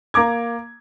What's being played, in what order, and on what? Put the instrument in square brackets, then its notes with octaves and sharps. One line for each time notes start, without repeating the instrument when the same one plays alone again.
[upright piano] A#3 A#5 D6 G#6